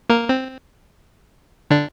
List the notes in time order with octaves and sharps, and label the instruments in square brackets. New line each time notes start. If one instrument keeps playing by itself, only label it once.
[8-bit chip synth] A#3 A#4
C4
D3 D4